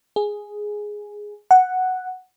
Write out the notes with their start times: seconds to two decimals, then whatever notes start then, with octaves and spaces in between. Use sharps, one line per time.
0.16 G#4
1.51 F#5